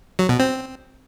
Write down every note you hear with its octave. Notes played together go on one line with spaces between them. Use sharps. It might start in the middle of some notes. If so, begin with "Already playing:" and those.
F#3
B2
C4